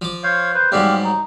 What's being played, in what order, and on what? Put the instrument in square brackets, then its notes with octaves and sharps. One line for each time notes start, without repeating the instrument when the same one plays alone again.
[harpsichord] F3 D6
[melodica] C5 C#5 F5
B4 C5
[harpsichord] G#2 F#3 G3 [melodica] C4 G4 F5
[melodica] D#4